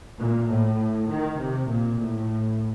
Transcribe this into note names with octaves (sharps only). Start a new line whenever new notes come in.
A#2
A2
D#3
C3
A#2
A2